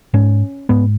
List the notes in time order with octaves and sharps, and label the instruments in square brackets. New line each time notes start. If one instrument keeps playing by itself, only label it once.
[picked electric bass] G#2 C#4
G#2 B3